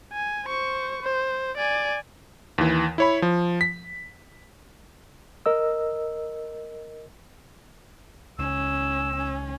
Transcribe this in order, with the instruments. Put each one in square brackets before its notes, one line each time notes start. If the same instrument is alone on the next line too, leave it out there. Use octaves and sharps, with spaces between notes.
[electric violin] G#5
C5 C#6
C5
D5 G#5
[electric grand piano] D#2 E3
E4 C#5 B5
F3
B6
[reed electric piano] A#4 D#5 E6
[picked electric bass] C#2 [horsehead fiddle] C#4 [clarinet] E6
[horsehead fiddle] C#4